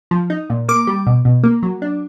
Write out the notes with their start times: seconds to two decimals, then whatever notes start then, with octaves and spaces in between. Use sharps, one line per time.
0.11 F3
0.30 D#4
0.50 A#2
0.68 A#3 D6
0.87 G3
1.07 B2
1.25 B2
1.44 A#3
1.63 F#3
1.82 D4